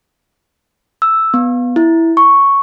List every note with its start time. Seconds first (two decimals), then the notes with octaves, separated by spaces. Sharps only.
1.02 E6
1.34 B3
1.76 E4
2.17 C#6